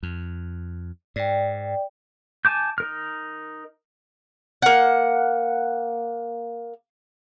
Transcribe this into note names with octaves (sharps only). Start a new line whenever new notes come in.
F2
G#2 D5 G5
G#5 A5 D6 G6
D#4 A#4 F6
A#3 F#5